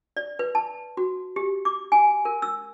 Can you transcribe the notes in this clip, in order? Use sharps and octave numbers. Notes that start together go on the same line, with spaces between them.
D5
B4
A5
F#4
G4
D6
G#5
A#4
E6